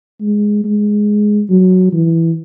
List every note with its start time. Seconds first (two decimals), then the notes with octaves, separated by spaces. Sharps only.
0.21 G#3
0.64 G#3
1.50 F#3
1.93 E3